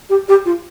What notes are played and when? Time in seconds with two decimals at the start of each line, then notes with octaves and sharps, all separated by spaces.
0.09 G4
0.28 G4
0.45 F4